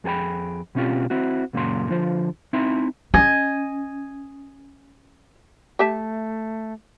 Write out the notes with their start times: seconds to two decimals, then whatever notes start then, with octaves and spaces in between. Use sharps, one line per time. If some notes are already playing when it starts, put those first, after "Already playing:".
0.04 F2 G#4 A4 G5 B5
0.75 B2 C4 C#4 F4 G4
1.10 C4 E4 F#4
1.53 C#2 F#2 A#2 C#3 F#3 C6
1.89 D3 F3 F4 C5
2.53 C4 D#4 E4 E5 C6
3.14 C#4 D#5 G#5
5.79 A3 G4 E5 A5